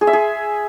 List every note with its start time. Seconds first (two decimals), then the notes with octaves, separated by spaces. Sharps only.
0.01 G#4
0.07 E5
0.13 G#4